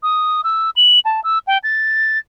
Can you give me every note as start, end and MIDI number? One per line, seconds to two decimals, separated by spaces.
0.03 0.41 87
0.44 0.70 88
0.76 1.00 102
1.05 1.20 81
1.24 1.39 88
1.47 1.58 79
1.64 2.18 93